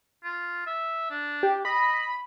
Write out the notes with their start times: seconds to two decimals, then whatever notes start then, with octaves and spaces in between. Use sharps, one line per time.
0.24 F4
0.66 E5
1.10 D4
1.43 G4
1.65 D#5 B5